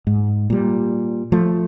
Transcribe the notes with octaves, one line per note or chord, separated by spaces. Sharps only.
G#2
A#2 G3
F3 A3